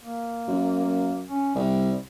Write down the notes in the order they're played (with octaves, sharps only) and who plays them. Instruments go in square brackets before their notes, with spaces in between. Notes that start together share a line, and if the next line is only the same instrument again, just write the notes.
[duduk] A#3
[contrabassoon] F#2
[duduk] A#3
C#4
[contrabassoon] C2 [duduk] G3